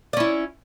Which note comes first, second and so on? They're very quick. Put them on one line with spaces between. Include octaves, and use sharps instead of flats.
D5 C#4 E4